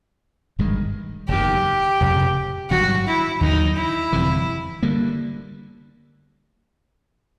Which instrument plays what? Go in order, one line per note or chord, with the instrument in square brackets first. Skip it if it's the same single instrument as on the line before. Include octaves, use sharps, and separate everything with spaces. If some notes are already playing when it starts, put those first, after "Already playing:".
[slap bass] G1 G2 D#3 G#3
[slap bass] F#1 E2 C3 D#3 [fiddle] G4
[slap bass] F1 F2 C#3
[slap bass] G#1 G2 D#3 F#3 [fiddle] F#4
[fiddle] E4
[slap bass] D#2 D3 F#3 [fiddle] D#4
[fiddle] E4
[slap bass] G1 F2 C3 E3
D3 G3 A#3